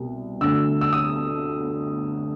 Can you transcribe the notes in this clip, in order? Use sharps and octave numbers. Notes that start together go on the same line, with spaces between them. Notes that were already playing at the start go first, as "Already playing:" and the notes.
Already playing: C2 B2
D2 D3 E6
E6
D#6